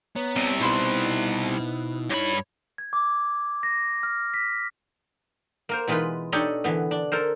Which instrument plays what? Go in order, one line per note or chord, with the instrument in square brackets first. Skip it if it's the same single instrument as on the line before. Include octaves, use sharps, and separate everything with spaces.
[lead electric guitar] B3 [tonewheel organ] C#5 A#5
[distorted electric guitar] C2 C3
[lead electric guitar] B2 [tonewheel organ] D#4 E4 [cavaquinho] B4 C5 B5
[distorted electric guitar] G2 B5 [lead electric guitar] C#5
[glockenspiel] G#6
D6
A#6
F6
B6
[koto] A#3 A#4 C5
B2 E3 G#3 D#4 F4 B4
D4 D#4 G4 A4 C#5 D#5
D3 E3 B3
D4
A4 A#4 C5